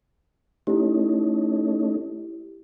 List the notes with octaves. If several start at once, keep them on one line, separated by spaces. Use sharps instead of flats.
A3 C#4 D#4 E4 G4